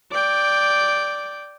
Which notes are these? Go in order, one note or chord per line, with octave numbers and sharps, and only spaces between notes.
D5 G5